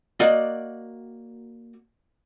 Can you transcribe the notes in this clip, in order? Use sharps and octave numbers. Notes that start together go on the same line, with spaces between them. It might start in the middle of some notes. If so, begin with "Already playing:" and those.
A#3 F#4 D5 D#5